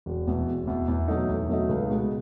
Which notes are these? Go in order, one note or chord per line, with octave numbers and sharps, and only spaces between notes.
E1
E2 B2
E1
E2 B2
E2
B2 F#3 A3 D#4
E2
B2 F#3 A3 D#4
C#2
B2 G#3